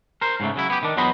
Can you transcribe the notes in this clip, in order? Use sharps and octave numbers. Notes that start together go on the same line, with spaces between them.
A#4 C5
G#2 C#3 A3
C#3 F#3 E4
B3 G4
D#3 D4
E2 F#3 B3 C5 D#5 B5